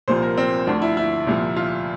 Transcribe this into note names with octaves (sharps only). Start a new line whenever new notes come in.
C2 A#2 F3 C5
A#4
C4
D2 D3 F3 D4
E4
E4
C2 A#2 F3
F4